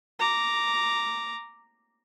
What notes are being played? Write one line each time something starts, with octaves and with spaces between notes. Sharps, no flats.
A#5 D6